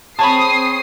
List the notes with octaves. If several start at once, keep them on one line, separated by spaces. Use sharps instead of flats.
C4 G#4 C#5 A5 B5 D#6 C7